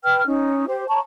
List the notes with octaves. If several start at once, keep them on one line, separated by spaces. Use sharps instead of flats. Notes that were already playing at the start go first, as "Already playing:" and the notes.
B4 G5 F6
C#4 D#4
G4 C5
C#5 A5 A#5 C#6